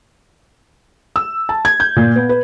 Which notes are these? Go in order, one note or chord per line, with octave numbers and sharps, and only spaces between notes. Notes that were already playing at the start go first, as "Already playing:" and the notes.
E6
A5
G#6
G6
A#2
B3
B4